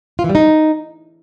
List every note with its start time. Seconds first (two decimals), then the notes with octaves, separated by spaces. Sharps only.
0.19 F4
0.24 E3
0.29 G3
0.35 D#4